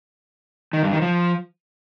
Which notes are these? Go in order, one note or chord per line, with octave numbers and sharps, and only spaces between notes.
D#3
G2
D#3
F3